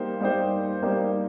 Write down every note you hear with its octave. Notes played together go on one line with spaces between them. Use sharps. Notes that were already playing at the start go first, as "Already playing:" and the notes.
Already playing: G3 A#3 D#4 G4 C5
G3 A#3 D#4 G4 C5
G3 A#3 D#4 G4 C5